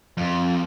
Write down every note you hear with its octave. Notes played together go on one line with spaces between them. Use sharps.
F2